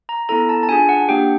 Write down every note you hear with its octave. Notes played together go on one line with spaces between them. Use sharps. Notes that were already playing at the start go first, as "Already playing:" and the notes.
A#5
B3 E4 A4 A#5
A5
A5
D4 F4 G#4 G#5
F#5
A#3 D4 G4 G5